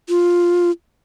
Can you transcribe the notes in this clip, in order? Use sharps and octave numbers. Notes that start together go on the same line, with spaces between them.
F4